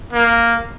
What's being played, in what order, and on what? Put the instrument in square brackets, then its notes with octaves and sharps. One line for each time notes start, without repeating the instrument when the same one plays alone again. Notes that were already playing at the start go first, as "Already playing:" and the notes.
[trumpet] A#3